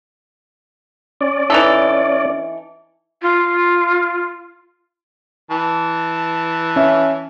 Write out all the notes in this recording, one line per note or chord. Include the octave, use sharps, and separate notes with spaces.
C#4 D5
E3 D#4 A4
F4
E3 A5
C#4 E5